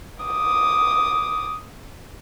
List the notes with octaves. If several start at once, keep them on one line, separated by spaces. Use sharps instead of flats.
D6 D#6